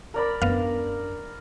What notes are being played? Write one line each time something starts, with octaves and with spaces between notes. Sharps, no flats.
A#4 D5 B5
F#2 B3 D4 B4 F5